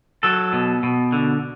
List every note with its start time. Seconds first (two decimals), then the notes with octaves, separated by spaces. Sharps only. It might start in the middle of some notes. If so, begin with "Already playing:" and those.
0.23 F#3 A4
0.53 B2
0.83 B2
1.12 D3